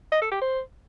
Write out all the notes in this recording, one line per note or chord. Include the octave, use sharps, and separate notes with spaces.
D#5
A4
G4
C5